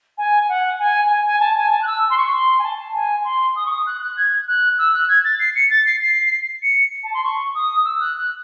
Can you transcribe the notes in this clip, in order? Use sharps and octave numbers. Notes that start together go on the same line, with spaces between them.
G#5
F#5
G#5
G#5
G#5
A5
G#5
A5
F#6
E6
C6
C#6
C6
G#5
A5
G#5
C6
D#6
C#6
D#6
F#6
F#6
G#6
F#6
E6
F#6
G#6
A6
C7
C#7
A6
C7
C7
C#7
A5
C6
C#6
D#6
E6
F#6
F#6